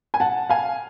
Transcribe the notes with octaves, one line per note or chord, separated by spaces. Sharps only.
G#5
F#5 A5
F5 G#5